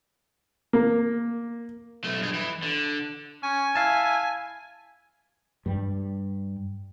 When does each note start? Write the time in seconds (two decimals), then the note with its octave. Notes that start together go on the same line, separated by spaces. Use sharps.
0.73 A#3
2.04 B1 A3
2.20 G2 G#4
2.34 E3
2.63 D3
3.43 C#4 G#5
3.75 E4 F5 A5
5.66 G2 G3